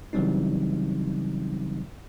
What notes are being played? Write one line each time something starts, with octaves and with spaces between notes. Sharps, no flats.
C#3 E3 F#3 G3 C4 D#4